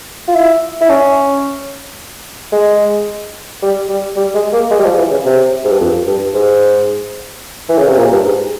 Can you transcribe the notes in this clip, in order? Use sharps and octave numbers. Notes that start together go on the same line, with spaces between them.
F4
E4
E4
C#4
G#3
G3
G3
G3
G#3
A#3
G#3
G3
F3
E3
C#3
C3
G#2
G2
F2
G2
G#2
E3
C#3
C3
A#2
G2
G#2